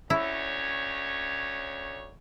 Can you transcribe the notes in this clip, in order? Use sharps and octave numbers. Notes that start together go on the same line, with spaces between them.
D2 C#4 E4 C#5